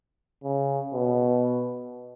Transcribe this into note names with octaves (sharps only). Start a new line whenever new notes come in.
C#3
B2